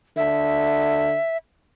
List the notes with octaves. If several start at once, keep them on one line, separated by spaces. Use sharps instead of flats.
D3 E5